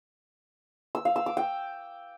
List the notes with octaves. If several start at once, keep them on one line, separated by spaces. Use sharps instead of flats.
E6
F5
E6
D6
G5